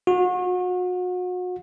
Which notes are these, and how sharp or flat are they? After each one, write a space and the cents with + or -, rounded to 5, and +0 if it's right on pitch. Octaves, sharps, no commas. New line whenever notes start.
F#4 -35